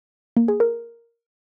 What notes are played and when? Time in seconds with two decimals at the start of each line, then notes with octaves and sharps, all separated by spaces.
0.37 A#3
0.48 G#4
0.60 A#4